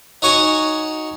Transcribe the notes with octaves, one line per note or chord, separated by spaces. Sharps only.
D#4 F#4 C#5 F#5 G#5